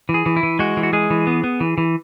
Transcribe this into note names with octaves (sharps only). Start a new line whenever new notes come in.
E3
G#4
E3
E4
E3
G#3 F#4
E3
F#4
G#3 G#4
E3
B3
B3
E3
E3